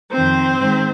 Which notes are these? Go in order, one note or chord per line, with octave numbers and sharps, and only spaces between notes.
F2 D#3 C4 C5
G#2 D#3